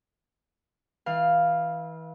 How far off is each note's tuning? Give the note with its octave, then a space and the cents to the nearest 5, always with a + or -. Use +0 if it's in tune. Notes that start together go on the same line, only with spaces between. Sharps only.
E3 -30 F5 +0